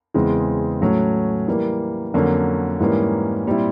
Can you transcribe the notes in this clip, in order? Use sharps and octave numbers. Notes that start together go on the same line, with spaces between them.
E2 C#3 E3 G#3 C4
A2 F#3 A3 C#4
E3 G3 A#3
F2 D3 F#3 A#3 C#4
G#2 E3 G3 A#3 C#4
A#2 G3 C4 E4